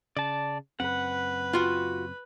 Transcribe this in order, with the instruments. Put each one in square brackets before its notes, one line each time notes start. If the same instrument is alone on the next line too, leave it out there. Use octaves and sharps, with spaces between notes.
[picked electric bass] C#3 [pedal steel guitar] D5 A5
[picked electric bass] F#1 F#2 C4 [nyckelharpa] B4 [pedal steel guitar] F#5
[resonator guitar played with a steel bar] F4 F#4